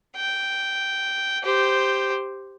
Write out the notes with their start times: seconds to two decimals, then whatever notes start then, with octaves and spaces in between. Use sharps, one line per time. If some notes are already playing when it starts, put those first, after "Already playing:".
0.17 G5
1.43 G4 C5